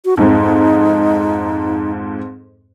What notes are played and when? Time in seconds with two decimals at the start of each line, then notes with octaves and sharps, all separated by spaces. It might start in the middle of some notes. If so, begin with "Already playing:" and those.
0.05 F#4
0.17 F2 G#2 D#4